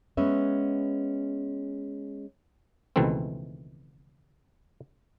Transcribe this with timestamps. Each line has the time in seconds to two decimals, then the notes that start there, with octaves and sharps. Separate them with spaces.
0.17 G#3 B3 C#4 B4 E5
2.96 C#2 B2 D#3 E3 A3 C4